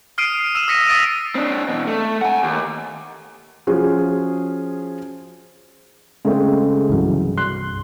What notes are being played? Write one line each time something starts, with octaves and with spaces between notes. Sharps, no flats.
D#6 F6 C7 D7 D#7
E6 D#7 E7
D#6 E6 A#6 B6 C#7 D#7
D#6 E6 A6 B6 D7 D#7
C4 D4
E2 B2
A3
F#5 G#5
D#2
F3 C#4 F4 F#4 G#4
C#3 G#3 A3 C4
C2 G2 E3 F#3
C6 F#6